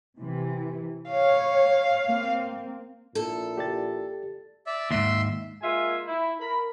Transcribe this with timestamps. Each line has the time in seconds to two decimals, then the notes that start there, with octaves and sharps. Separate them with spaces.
0.19 C3 E3
1.09 C#5 F5
2.05 A#3 C4
3.15 A#1 A#2 E4 A4
3.57 G4 D5 A6
4.66 D5 E5
4.91 D#2 G#2 E5 C6
5.62 G#3 A#3 F4 E5 G#5
6.07 E4
6.39 A#4 B5